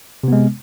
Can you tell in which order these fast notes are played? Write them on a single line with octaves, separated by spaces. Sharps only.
C3 B3 G#3